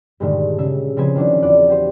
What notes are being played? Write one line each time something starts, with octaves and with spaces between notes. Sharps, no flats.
G2 A#2 D3 D#3 G#3 A3
C#3 G#4 E5
C#3 F3 C4 B4 G#5
D#3 F3 D4 E4 F#4
E2 F4 D5 F#6
F#4 G4 C5